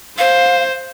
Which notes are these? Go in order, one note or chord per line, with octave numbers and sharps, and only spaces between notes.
C5 F5